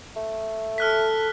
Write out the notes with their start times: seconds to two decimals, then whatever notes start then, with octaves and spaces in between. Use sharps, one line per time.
0.16 A3
0.78 A4 F6 F#6 B6